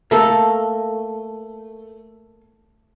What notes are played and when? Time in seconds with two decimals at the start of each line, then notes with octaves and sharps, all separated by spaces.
0.11 A3 A#3 A4